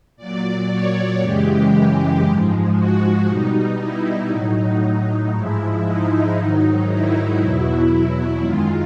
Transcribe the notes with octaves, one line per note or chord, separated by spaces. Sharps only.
A#2 F#3 D5
C#5
F#2 C#3 E3 G#3 G4
G#2 F3 G#3
F#4
B2 G3 D#4
E4
A2 F#3 D#4
D#4
G#2 F3 G#3 E4
D#4
G#2 D#3 F#3
E4
E2 B2 F#3
E4
F#2 D#3 G#3 F4